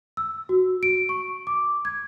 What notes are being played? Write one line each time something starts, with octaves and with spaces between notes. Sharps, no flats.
E6
F#4
D7
C#6
D6
G#6